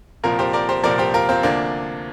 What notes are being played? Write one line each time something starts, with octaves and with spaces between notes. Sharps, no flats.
C2 A#2 F3 F4 A#4
G4 C5
A#4 D5
G4 C5
C2 A#2 F3 A#4 D5
G4 C5
F4 A#4
C4 F4
D2 C3 F3 A#3 D4